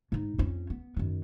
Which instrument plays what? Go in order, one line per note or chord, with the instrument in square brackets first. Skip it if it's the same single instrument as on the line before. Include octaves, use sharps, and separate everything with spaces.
[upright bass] G#2 D#4
F2 C#4
B3
F#2 D#3